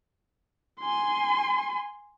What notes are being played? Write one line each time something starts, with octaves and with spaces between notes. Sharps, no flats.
G#5 C6